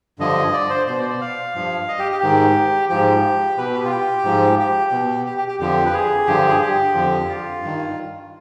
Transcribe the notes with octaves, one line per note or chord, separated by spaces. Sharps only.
G2 D3 F3 D#5
D5
C5
B2 C5
D5
D5
F5
G2 F3
D#5
G4
G4
G#2 D#3
G#2 F3 G4
B2 B4
G4
F4
G4
G#2 F3
G4
B2
G4
G4
G4
F2 D3 F3 G4
B4
G#4
G2 D3 F3 G4
G#4
G4
F2 D3 F3
F4
G2 D#3